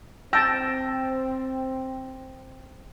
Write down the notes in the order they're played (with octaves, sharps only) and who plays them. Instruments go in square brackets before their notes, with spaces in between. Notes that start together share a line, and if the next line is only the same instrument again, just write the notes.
[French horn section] C4 [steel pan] G5 A5 [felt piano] E6 A#6